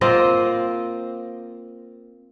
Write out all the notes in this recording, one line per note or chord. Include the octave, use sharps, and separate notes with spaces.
A#3 C4 F4 D#5